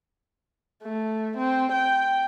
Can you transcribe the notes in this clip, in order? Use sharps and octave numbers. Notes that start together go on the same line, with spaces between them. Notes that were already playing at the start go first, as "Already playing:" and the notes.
A3
C4
G5